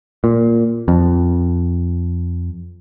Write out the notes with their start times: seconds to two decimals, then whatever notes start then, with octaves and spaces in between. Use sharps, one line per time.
0.24 A#2
0.88 F2